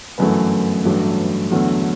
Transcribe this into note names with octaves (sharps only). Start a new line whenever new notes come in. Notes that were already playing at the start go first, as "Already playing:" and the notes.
G1 F#2 E3 A3 B4
A1 G2 F#3 A3
E2 D3 F#3 A3